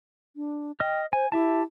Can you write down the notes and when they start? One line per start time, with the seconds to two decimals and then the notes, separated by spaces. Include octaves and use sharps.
0.36 D4
0.80 D#5 G5 F6
1.13 C5 G#5
1.32 E4 G4 E5 A5